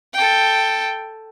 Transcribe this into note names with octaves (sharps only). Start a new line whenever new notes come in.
A4 G5